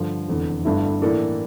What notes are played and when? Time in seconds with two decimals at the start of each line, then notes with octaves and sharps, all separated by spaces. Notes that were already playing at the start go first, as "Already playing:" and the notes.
Already playing: G2 D3 F3
0.28 F1 E2 D3
0.64 G1 G2 D3 A3 E4
1.02 A2 E3 A#3 D4 A4